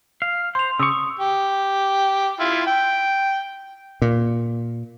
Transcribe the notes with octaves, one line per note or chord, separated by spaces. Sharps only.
F5
C5 C6 F7
C#3 C#6 D#6 E6
C#6
G4
E4 F4
G5
A#2